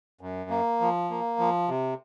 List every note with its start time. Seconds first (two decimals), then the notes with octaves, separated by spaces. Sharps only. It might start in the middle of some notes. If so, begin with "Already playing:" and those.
0.21 F#2
0.50 A#3
0.81 F3
1.10 A#3
1.39 F3
1.69 C3